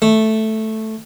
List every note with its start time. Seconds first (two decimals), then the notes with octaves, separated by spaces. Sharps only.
0.02 A3